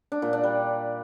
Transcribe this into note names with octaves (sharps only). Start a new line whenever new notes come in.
D4
A#2
D4
G3